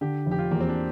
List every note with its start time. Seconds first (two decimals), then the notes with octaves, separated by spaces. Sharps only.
0.01 D3 G4
0.26 F1
0.31 G4
0.39 F4
0.51 E2 A#3
0.60 C4
0.69 D4